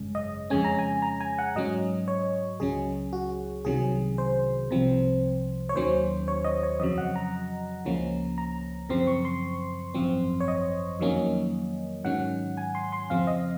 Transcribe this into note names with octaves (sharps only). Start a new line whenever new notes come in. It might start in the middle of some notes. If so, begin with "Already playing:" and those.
Already playing: G#1 F#2 C#3 G#3 C#4
D#5
F2 C#3 G#3 C#4 G#5
A#5
G#5
A#5
G#5
F#5
G#2 F#3 C#4 D#5
C#5
C#2 C#3 F#3 C#4 G#4
F#4
C2 C3 D#3 F#3 C#4 G#4
C5
C2 C3 F3 C4
C#5
D#2 D#3 F#3 C#4 C5
C#5
D#5
C#5
F2 C#3 F#3 D#5
F#5
A#5
C#2 C#3 F3 A#3 C#4
A#5
F#2 C#3 F3 C4 C6
C#6
C6
G#1 F#2 F3 C4
C#5
D#5
F2 D#3 F#3 A#3 C#4
G#2 D#3 F#3 C#4 F#5
G#5
C6
C6
F2 C#3 F3 C4 F5
D#5